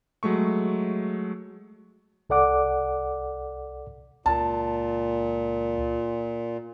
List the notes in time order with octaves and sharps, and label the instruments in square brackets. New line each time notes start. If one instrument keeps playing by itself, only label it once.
[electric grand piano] F#3 G#3 A3 C#6
[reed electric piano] C2 A4 D5 F#5 D6
[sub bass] C#2 [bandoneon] A#2 [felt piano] A5